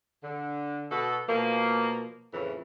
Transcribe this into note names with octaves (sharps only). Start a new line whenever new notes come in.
D3
B2 F#4 A4
B2 F3 A#3
F2 A2 C#3 E3